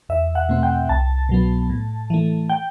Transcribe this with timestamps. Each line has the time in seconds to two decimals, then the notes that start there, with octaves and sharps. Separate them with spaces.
0.09 E2 E5
0.35 F#5
0.49 B2 A3 C4
0.63 G5
0.89 C2 A5
1.29 B2 F#3 B3
1.70 A2
2.10 E3 A3
2.50 G5